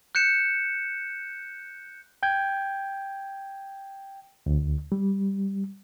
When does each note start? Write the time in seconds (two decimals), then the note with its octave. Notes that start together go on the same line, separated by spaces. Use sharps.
0.15 F#6 G6 C#7 E7
2.23 G5 G6 G#6
4.46 D2
4.92 G3